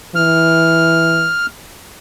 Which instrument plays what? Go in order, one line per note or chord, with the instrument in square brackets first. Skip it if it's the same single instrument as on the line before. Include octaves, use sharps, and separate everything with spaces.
[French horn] E3 [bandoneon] F6